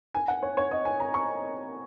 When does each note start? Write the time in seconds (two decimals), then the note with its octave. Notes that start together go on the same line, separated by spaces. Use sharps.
0.14 G#5
0.28 F#5
0.43 C#5
0.57 C#5
0.71 D#5
0.85 G#5
1.00 A#5
1.14 C#6